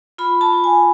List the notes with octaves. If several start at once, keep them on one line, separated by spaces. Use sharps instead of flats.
F4 B5
A5
F4
G#5